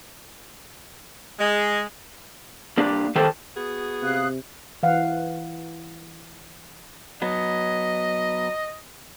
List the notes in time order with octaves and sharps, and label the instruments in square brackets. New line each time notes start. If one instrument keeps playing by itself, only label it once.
[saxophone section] G#3
[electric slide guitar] A#3 D4 G4 D5
D#3 G4 A4 C5 G5 A5
[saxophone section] B3 F#4 G#4
[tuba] C3 [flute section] F5 D#6 F#6
[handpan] E3 F5 F#5
[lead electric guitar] F#3 B3 [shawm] D#5